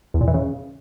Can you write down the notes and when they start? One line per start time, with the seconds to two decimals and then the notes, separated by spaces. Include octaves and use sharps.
0.14 E2
0.21 A#2
0.27 E3
0.34 C#3